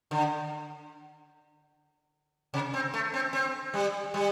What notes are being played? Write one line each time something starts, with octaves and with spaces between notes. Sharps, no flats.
D3
C3
C4
A3
C4
C4
G3
G3